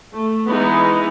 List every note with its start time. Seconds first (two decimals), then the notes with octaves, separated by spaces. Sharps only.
0.14 A3
0.50 E3 G#3 B3 D#4 E4